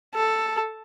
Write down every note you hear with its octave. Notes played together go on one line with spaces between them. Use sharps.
A4